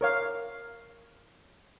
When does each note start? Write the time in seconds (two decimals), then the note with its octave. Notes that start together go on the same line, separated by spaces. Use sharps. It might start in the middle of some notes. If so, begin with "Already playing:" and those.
0.01 A#4 C#5 F5